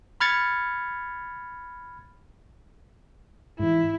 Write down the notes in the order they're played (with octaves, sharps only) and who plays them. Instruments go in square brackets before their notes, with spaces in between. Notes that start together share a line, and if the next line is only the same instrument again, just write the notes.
[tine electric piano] B5 F6 G#6 A6 C#7
[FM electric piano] G#2 E3 [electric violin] E4